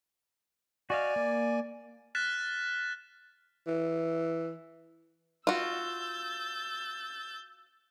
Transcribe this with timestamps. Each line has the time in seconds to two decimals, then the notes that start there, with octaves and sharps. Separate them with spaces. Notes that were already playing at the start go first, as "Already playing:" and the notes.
0.90 F#4 D5 D#5 F5 G#5
1.16 A#3
2.15 F6 F#6 A6 B6 E7
3.67 E3
5.47 F4 F#4 E6 G6 A6